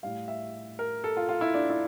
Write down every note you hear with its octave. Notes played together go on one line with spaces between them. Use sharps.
A2 G3 F5
E5
A#4
A4
F4
F4
E4
D4
E4